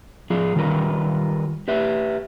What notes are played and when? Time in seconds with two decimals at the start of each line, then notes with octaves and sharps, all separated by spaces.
0.30 F3 F4 G#4
0.56 D#3 G3 F4 A#4 B4
1.68 G4 B4 E5